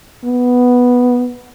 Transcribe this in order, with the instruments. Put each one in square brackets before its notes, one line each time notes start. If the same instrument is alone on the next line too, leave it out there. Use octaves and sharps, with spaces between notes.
[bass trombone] B3